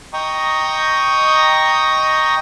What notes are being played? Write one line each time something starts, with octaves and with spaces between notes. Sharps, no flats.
D#5 G5 A#5 C#6 D#6